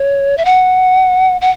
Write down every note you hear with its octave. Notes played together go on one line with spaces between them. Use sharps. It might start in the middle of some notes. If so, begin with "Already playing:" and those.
Already playing: C#5
E5
F#5
F#5